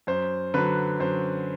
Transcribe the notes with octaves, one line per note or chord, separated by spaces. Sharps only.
F#2 C5
D3 F#3 B4
F#2 C5